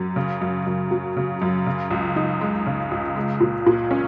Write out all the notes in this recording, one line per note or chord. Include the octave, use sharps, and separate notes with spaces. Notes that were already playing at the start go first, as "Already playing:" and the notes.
Already playing: F#2 F#3
C#3
F#2
F#2
F#3
C#3
F#2
C#3
C#2
D#4
G#3
C#3
C#2
G#3
A#2
A#2
C#4